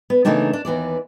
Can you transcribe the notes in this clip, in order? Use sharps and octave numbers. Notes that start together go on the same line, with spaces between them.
B3
C#3 E3 A3 A#3 D4 D#4
D4
D#2 E3 B3 D5